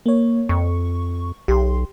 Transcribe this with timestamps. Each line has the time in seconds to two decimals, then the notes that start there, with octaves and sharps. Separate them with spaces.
0.06 A#3 C#5
0.49 F2 C#6
1.48 B1 G4 C6